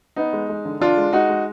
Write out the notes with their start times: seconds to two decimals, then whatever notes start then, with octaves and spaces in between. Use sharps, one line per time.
0.16 B3 D#4
0.33 G#3
0.49 G#3
0.65 D3
0.80 D3 D4 F4
0.97 G#3
1.13 G#3 D#4 F#4
1.29 G#3